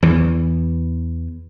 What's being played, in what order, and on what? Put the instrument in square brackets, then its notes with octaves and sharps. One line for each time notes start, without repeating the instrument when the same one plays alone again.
[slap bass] E2 E3